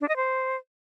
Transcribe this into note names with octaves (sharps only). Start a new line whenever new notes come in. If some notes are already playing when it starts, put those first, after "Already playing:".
D4
D#5
C5